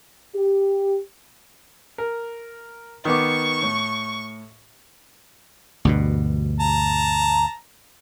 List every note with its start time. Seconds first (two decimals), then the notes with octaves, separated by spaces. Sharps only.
0.35 G4
1.98 A#4
3.05 D#3 B3 C#6 D6
3.62 A2
5.85 D2 G2 B2
6.60 A5 A#5